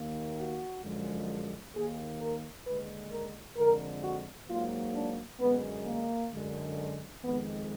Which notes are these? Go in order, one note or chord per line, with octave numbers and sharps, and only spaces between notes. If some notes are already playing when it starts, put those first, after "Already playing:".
Already playing: D#2 D#3 A#3
F#4
F#2 D3 F3 G#3
D#2 D#3 A#3 G#4
A#4
D#2 D3 G#3 B4
A#4
F2 D3 G#3 A#4
F#4
G#2 F#3 A#3 F4
D4
F#2 D3 G#3 B3
A#3
F#2 D3 G#3
F2 D#3 G#3 B3